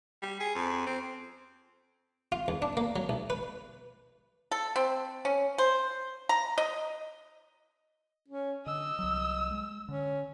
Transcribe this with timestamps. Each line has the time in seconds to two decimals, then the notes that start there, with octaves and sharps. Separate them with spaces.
0.23 G3
0.40 G#4
0.55 F2
0.86 C4
2.32 F4
2.48 E2
2.62 D4
2.77 A#3
2.96 F#3
3.09 B1
3.30 B4
4.51 A4
4.76 C4
5.25 C#4
5.58 C5
6.29 A#5
6.58 D#5
8.28 C#4
8.66 D3 D#5 E6
8.99 C2 F#3
9.51 G#3
9.89 D3 C#4